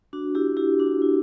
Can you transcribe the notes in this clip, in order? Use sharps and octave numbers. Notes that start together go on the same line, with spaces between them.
D4 F#4
E4 G4
E4 G4
D4 F#4
E4